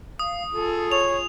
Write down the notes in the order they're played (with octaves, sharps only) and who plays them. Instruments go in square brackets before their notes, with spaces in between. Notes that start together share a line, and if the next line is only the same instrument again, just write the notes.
[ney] F5 [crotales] D#6
[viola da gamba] F4 G#4 [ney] A4
[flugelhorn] C#5 [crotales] F7